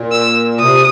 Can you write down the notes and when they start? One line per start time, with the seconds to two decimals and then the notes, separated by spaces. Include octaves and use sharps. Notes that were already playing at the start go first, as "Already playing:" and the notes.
Already playing: A#2
0.12 E6
0.58 C3 D#6